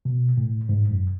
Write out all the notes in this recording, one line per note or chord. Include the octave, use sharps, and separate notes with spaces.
B2
A2
G#2
F#2